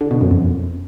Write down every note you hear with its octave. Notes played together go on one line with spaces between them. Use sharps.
D3
B2
F#2
F2